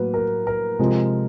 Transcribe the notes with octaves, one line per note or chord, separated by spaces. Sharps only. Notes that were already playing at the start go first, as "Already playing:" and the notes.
Already playing: A2 F#3 A#3 B4
A#4
A#4
C3 F3 G#3 C4